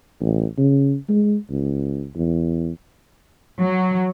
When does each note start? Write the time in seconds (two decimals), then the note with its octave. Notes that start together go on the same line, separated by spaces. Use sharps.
0.21 A1
0.58 C#3
1.09 G#3
1.50 C#2
2.16 E2
3.59 F#3